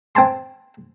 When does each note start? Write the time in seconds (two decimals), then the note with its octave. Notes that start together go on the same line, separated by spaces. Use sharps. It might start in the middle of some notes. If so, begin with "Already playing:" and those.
0.15 C4 G#5 A5 C6